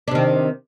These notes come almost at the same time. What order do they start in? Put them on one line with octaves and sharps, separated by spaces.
D4 C3 D#3